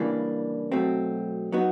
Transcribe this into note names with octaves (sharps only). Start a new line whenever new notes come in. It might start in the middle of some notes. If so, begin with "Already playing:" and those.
Already playing: C#3 E3 G3 A#3 D4
B2 F#3 A3 C4
F#3 B3 D#4 F#4